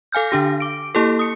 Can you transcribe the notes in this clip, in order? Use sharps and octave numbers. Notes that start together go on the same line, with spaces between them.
A4 F5 G#5 F6 G6
D3 D4 G4 A#6
D6 D7
A#3 E4 G4 A4
D#6 C#7